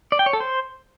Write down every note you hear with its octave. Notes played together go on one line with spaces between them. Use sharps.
D5
G5
C#5
A4
C5